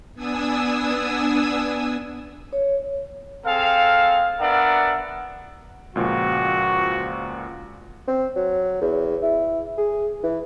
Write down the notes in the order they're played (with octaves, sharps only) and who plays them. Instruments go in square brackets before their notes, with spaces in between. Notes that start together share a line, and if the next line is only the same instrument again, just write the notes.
[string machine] B3 D4 G#5 D#6 E6
[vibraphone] C#5
[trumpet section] C4 G#4 A4 F5
B3 D4 A#4 D5 E5 F#5
[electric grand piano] C#2 A#2 F3 [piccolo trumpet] F#4
[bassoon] C4
F#3
E2
E4
G#4
E3